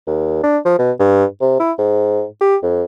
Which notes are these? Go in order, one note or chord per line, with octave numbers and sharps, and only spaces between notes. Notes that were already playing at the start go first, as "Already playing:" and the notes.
D#2
D4
F3
B2
G2
C3
E4
G#2
G4
F2